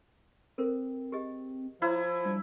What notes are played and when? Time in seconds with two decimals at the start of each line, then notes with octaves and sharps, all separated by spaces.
0.58 C4 A4 A#4 C5
1.12 G4 G#4 D#5
1.82 F3 E4 C#5 A#5 C6
2.25 G3 D4